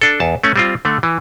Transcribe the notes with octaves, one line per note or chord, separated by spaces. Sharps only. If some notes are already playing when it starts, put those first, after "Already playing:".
D4 A4
E2 A5
A3 C#4
G3 C4 F4
D3 A3
E3